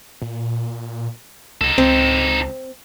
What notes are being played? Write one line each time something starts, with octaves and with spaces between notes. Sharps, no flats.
A#2
C#2 D#4 A4
C#2 C4